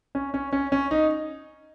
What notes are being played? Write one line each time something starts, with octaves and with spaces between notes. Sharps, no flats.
C#4
C#4
C#4
C#4
D#4